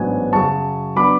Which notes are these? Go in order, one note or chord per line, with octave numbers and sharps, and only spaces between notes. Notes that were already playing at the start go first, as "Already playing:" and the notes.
Already playing: A1 G#2 F#3 B3 D4 G#5
F#2 C#3 F#3 A5 C#6
F#3 B3 D4 B5 D6